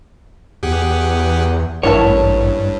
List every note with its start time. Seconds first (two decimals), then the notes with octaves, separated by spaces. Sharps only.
0.63 E2 G4 G#4 F#5
1.83 A1 G2 A#3 E4 C#5 A5